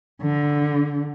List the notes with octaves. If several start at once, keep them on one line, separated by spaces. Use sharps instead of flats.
D3